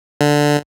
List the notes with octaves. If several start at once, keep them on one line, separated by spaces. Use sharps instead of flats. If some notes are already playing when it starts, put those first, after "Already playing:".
D3